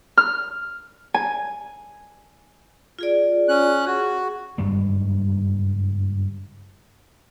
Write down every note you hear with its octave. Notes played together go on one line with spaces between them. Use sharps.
F6
G#5
F4 G#4 D5
C#4 F#6
F#4 G#4
F#1 G2 G3 G#3